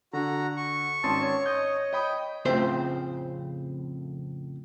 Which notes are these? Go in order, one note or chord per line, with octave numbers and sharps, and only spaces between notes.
D3 F#4 A#5
C#6
G#1 C#4 A5 C6
C#5
D#5 G6
D#5 G5 B5 D#6
F2 A2 C#3 C4 C5